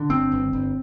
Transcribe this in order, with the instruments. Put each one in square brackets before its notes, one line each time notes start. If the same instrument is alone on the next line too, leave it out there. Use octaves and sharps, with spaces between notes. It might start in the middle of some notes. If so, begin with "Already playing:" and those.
Already playing: [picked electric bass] D3
G1 C4
G1
G1